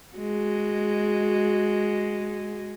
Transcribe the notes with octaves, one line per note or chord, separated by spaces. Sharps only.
G#3 F#4